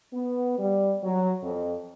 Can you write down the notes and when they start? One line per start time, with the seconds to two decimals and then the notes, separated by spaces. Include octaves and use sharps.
0.13 B3
0.58 G3
1.03 F#3
1.43 F2